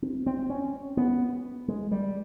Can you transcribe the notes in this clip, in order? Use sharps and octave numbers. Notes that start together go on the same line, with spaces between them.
C4
C4
C#4
B3
G#3
G3